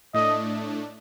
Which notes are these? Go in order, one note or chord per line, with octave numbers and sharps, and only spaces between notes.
A2 A3 D4 D#5